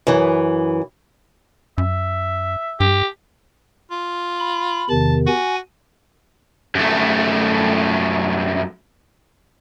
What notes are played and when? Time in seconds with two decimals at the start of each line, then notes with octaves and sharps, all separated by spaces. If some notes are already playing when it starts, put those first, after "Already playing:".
0.07 F#2 E3
1.78 F#2 E5
2.80 G2 G4
3.91 F4
4.40 B5
4.90 E2 C3 D#3 A5
5.27 F#4 G#5
6.75 F#2 A3